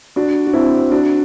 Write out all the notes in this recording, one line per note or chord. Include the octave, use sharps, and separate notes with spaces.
D4 F#4
F#4
C4 E4
D4 F#4